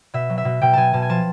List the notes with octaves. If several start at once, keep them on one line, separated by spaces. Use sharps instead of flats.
B2 E5
F#3
E5
B2
B2 G5
B2 G#5 A5
B2 A5
G#5
F3 A5